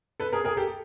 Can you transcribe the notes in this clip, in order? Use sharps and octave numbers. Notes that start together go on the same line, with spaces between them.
A4 B4
G#4 A#4
G#4 A#4
G4 A4